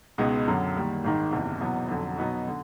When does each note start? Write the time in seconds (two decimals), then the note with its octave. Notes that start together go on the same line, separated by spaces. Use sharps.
0.18 C#2 B2 G#3 B3 D#4
0.48 F#2 D3 F#3
0.76 D#3 G3 A#3
1.04 G#1 G#2 D#3
1.32 F#1 E2 C3
1.60 E2 B2 F#3 B3
1.89 F2 D3 F#3
2.17 B2 F#3 B3 D#4 F#4
2.48 D3